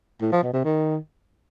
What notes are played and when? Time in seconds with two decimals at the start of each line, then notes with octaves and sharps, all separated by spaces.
0.22 A2
0.32 F3
0.43 B2
0.54 C3
0.64 D#3